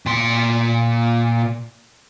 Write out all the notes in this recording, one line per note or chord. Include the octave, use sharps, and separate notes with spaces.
A#2 C6